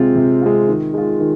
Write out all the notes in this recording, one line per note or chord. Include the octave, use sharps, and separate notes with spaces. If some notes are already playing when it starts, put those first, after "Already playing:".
Already playing: C3 G#3 C4 F4
C3
G#3 C4 F4
D#3
G#3 F4
D#3